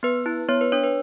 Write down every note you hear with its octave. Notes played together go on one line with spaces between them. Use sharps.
B3 B4
E4
B3 C#5
B4
D4 C#5
B4